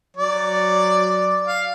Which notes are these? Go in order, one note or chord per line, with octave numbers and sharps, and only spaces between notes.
F#3 D5
F5